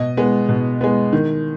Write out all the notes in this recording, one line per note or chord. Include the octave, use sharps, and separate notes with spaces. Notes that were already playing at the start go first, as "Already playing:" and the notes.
Already playing: B2 D#5
G#3 B3
B2
G#3 B3
D#3